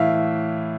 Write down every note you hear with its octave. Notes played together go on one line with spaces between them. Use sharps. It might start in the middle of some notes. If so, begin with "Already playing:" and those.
Already playing: A2 E3 E5 F5